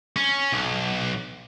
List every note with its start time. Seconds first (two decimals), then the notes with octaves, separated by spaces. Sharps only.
0.17 C#4
0.52 B1